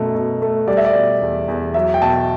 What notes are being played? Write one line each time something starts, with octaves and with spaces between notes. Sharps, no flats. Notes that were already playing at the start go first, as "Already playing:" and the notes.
Already playing: F#2 B2 A3
B2
A3
G3 D5
E5
D5
B2
E2
E2
F#3 E5
G5
B2 A5